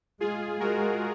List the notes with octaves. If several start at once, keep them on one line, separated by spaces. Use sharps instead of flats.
G#3 F4 G#4
G#3 F#4 A#4